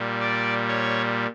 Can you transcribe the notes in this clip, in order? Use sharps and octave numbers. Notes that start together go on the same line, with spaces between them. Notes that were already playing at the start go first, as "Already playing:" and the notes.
Already playing: A#2 G3
D5
C#5